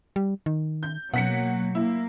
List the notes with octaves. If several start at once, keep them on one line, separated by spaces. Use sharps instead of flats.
G3
D#3
G6
B2 F#3 A#3 F#5 B6 C#7
A#3 E4